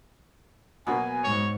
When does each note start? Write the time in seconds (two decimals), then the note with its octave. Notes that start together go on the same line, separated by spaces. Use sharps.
0.87 B2 F#3 A#3 B3 G#5
1.24 G#2 C#5